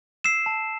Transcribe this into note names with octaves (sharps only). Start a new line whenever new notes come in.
E6 C7 E7
A5